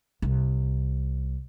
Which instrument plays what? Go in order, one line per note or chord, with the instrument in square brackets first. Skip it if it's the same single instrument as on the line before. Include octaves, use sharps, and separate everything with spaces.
[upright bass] C2